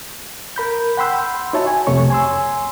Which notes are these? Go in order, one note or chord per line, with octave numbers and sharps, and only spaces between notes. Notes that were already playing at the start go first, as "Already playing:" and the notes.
A#4 B5 G6
F#5 G5 B5 C6 E6 G6
D#4 F#4 C#5 E5 A5
G#5
C2 F2 C3 A3 C#5 C#6
G#5 C6 E6